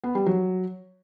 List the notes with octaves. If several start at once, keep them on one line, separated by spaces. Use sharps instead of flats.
B3
G3
F#3